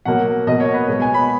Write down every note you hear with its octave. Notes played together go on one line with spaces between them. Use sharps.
B2 F#3 A#3 F#5
B2 A#3 D#5
C#5
B4
B2 G#3 B3 C#5
G#5
B5